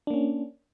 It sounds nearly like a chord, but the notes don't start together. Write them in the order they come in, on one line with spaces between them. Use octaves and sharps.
D4 A#3 C#4